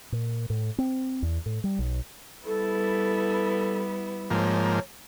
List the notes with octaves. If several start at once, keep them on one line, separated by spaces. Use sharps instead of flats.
A#2
A2
C4
E2
A2
G3
B1
G3 B3 E4 A4
G#2 F3 A#3 C#5